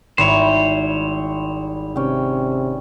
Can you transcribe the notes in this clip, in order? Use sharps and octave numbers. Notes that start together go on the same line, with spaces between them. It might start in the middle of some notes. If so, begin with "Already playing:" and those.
G#1 G3 E4 C5 C#5
C3 C#4 D5 G5